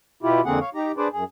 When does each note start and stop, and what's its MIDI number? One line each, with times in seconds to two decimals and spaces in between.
0.23 0.41 47
0.23 0.41 64
0.23 0.41 65
0.23 0.41 67
0.45 0.59 41
0.45 0.59 50
0.45 0.59 58
0.45 0.59 60
0.45 0.59 68
0.45 0.59 78
0.60 0.70 73
0.60 0.70 77
0.75 0.92 63
0.75 0.92 67
0.75 0.92 82
0.97 1.08 62
0.97 1.08 68
0.97 1.08 71
0.97 1.08 72
0.97 1.08 74
1.13 1.24 42
1.13 1.24 68